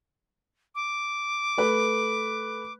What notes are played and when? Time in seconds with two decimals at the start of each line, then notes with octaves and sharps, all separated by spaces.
0.75 D6
1.58 A3 B4